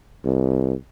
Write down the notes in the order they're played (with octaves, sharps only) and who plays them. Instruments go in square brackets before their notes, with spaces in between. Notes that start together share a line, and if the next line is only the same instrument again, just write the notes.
[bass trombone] C2